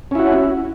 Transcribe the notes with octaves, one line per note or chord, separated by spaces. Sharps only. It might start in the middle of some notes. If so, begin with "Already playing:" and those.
C#4 E4 F#4